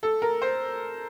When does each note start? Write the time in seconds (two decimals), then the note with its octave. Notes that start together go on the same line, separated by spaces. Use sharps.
0.03 A4
0.22 A#4
0.42 C5